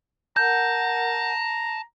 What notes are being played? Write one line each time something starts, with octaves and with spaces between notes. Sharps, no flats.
A#4 F#5 A5 A#5 G6